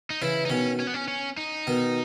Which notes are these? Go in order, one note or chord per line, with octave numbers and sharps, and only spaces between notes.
D#4
C#3 E3 E4
D#4
B2 D#3 C#4
C#4
B3
C#4
C#4
D#4
B2 D#3